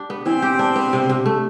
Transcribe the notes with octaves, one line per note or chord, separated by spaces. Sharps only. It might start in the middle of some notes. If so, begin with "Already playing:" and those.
Already playing: D4 G4
B3
E3 C4
G4
D4
B3
C3
C3
A3